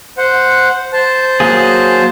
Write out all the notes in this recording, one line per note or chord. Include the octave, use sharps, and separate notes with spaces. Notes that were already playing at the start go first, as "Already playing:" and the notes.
C5 F#5
C5 A5
F#3 A#3 G#4